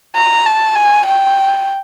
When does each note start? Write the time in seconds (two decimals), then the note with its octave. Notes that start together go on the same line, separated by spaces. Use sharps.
0.15 A#5
0.45 A5
0.75 G#5
1.06 G5